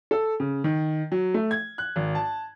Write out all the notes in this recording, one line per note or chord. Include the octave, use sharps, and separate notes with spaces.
A4
C#3
D#3
F#3
A3
G#6
F#6
G#1
A5